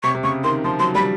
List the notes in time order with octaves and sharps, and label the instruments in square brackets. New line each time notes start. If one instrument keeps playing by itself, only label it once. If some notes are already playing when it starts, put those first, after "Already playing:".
[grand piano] C3 [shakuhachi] C#6
[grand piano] C3
[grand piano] C#3 [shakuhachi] C#6
[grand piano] D#3 [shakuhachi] C6
[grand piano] F3 [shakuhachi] C6
[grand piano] F#3 [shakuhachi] C6
[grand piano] G3 [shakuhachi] B5